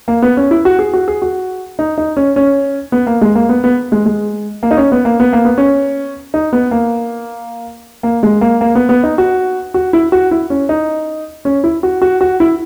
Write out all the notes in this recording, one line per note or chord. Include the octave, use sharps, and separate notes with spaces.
A#3
B3
C#4
E4
F#4
G#4
F#4
G#4
F#4
D#4
D#4
C#4
C#4
B3
A#3
G#3
A#3
B3
B3
G#3
G#3
A#3
D#4
C#4
B3
A#3
B3
A#3
B3
C#4
D#4
B3
A#3
A#3
G#3
A#3
A#3
B3
B3
D#4
F#4
F#4
E4
F#4
E4
C#4
D#4
C#4
E4
F#4
F#4
F#4
E4